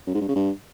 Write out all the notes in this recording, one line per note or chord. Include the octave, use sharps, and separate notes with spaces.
F#2
G#2
G2
C#3
G2